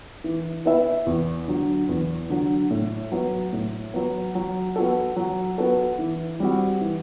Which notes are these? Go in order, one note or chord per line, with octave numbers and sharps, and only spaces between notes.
E3
B3 E4 B4 E5
E2
D3 F#3
E2
D3 F#3
A2
F#3 B3
A2
F#3 B3
F#3
B3 F#4 A4
F#3
B3 F#4 A4
E3
G3 C4 F#4
E3